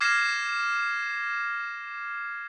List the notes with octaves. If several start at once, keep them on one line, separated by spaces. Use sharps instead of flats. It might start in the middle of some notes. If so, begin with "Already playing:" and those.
D6 F6 G#6 A#6 C7 E7